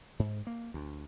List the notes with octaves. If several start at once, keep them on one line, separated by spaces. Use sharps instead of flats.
G#2
A#3
D2